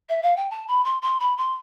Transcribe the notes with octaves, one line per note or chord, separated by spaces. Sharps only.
E5
F5
G5
A5
B5
C6
C6
B5
C6